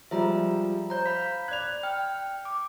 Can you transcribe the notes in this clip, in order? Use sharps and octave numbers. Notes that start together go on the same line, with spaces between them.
F3 G3 G#3 E5 A#5
C5 A#5 G6
F5 B5 B6
D5 F#6 G#6 F7
G5 F6
D6